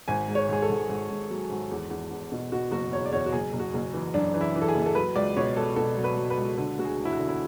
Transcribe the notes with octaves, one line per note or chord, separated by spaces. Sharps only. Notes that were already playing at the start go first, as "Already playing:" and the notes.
G#1 G#5
G#2
C#5
G#1 G#4
A4
G#1
G#1
G#1
F#3
G#1
E2
E2
E2
B2
B2 F#4
F#1 F#4
E2 C#5
D5
E2 C#5
F#4
F#1 G#4
F#1
F#4
F#1
E3
F#2 D4
E3
E4
E3
A4
G#4
F#1
A4
F#3 B4
C#2 D5
B2 C#5
C#2 A4
B2 A4
F#3
B4
F#3
B4
C#2
D3 A4
D2 F#4
G#4
E1
E4
F#4
D3
E4